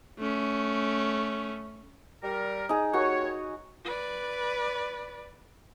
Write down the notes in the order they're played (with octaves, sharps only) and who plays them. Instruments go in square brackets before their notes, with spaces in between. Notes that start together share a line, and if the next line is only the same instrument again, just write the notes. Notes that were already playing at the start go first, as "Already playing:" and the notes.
[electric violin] A3 C#4
[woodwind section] G3 A#4
[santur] D#4 G#4
[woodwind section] D#2 C#5 [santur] F#4
[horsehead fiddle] B4 D5